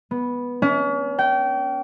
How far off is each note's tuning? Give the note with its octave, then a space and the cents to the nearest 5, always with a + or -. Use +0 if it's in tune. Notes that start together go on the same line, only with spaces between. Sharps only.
B3 -10
C#4 +40
G5 -25